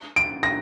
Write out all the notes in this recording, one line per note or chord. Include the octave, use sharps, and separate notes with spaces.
D7
A#6